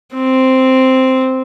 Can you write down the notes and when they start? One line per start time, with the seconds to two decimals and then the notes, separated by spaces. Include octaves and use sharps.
0.14 C4